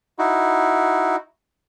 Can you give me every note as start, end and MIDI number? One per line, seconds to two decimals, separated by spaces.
0.19 1.16 63
0.19 1.16 64
0.19 1.16 66